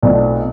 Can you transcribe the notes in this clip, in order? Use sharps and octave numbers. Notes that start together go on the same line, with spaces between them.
B1 B2 A3 C4 F4 D5